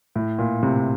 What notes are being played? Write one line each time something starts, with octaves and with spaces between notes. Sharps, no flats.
A2
A#2
A2 C3